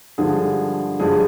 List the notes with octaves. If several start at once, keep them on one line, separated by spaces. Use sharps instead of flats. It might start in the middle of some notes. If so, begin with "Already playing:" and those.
G2 D3 F3 G#3 G#4
G2 D3 F3 G#3 G#4